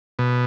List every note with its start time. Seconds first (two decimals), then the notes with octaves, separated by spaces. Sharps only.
0.19 B2